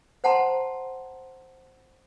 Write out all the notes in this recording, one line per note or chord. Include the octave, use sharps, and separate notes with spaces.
C5 F#5 A5 A#5 C6